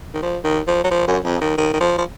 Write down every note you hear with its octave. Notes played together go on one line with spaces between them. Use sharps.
D#3
F3
D#3
F3
F#3
F3
F#2
F2
D#3
D#3
D#3
F3
F3